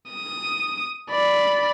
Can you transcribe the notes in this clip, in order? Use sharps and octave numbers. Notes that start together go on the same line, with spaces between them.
D#6
D5 B5